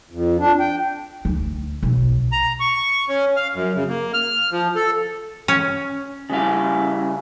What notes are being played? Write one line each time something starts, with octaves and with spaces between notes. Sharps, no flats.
F2
D4
G5
D2
B1
A#5
C#6
C#4
F5
F#2
C#3
A#3
F6
F3
A4
C#4
C#3 G3 E4 F5